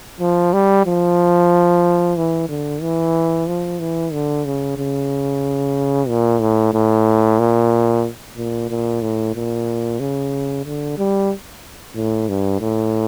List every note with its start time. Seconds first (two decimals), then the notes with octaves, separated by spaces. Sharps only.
0.20 F3
0.53 G3
0.86 F3
2.17 E3
2.49 D3
2.81 E3
3.47 F3
3.79 E3
4.13 D3
4.45 C#3
4.78 C#3
6.09 A#2
6.41 A2
6.74 A2
7.39 A#2
8.37 A#2
8.69 A#2
9.02 A2
9.35 A#2
10.00 C#3
10.66 D3
10.98 G3
11.95 A2
12.29 G2
12.61 A2